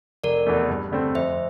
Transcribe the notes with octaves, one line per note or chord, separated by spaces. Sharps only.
F1 A#4 D5
E2 E3 A3
G2
D3 A3 C4
F2 C5 E5